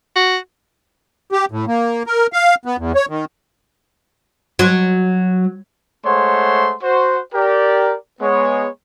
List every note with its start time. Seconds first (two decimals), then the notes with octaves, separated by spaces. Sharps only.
0.16 F#4
1.32 G4
1.51 A2
1.67 A#3
2.06 A#4
2.33 F5
2.65 B3
2.78 E2
2.95 C#5
3.09 D#3
4.59 F#3
6.04 G#3 A3 C5 C#5 F#5 C6
6.83 F#4 C5
7.34 G4 A#4 D5
8.21 G#3 B3 C#5